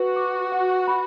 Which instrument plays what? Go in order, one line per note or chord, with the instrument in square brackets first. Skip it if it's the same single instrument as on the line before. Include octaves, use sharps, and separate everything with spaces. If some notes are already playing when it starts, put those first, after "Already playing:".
Already playing: [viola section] F#4 [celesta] B4
[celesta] D6
F#5
B5